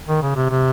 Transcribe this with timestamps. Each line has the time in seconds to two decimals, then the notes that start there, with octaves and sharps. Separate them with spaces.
0.08 D#3
0.22 C#3
0.36 C3
0.49 C3